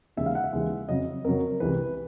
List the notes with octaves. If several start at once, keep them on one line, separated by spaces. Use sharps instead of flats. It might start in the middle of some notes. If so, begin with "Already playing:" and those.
D#2 C#3 E3 G#3 E5
F5
F#5
E5
D#2 C#3 E3 G#3
F2 C#3 F#3 D#5
F2 C#3 F#3 A#4
C2 C3 E3 G#3 B4